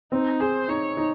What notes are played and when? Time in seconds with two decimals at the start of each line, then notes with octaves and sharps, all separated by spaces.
0.12 C4 D#4
0.40 G#4 C5
0.68 D#4 C#5
0.97 D#4